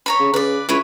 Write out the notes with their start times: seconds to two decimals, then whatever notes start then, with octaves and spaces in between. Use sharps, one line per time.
0.06 C#5 A#5 B5
0.19 C#3
0.34 C#3 B4 D5
0.69 C#2 E4 B4 C#5